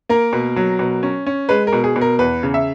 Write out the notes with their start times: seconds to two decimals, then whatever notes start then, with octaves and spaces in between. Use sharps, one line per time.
0.09 A#3 A#4
0.33 B2
0.56 F#3
0.79 B2
1.03 C#4
1.26 C#4
1.49 G#3 B4
1.67 A#4
1.73 B2
1.84 G#4
1.96 B2
2.01 A#4
2.19 E2 B4
2.43 C#3
2.54 E5